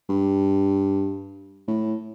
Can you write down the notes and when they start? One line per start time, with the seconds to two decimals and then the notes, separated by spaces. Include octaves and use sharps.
0.09 G2
1.68 A2